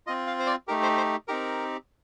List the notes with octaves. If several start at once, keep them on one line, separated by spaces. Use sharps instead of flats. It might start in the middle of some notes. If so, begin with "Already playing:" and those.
C4 F4 D#5
F5
C5
D5
A3 D#4 G4 A#4
C5
C5
C4 D#4 G4 A#4